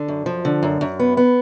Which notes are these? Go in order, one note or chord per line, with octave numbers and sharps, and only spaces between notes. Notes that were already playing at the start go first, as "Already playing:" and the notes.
Already playing: D3
F#2
F3
D3
F#2
F#2
B3
B3